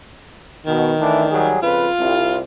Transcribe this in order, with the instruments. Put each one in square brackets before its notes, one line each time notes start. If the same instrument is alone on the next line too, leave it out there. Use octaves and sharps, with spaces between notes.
[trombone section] B2 [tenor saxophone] D#3
[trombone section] E3 A3 D4
F#3 G3 G#4
[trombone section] F2 C#3 B4 [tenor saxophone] F4
[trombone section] C2